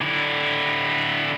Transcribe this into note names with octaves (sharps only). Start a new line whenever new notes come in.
D3 E4